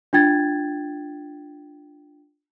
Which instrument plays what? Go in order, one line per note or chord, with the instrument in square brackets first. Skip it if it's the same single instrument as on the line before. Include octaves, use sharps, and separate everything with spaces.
[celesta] D4 F4 G5 G#6 A6